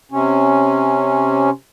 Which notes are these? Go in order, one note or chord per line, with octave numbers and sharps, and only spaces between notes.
C3 C#4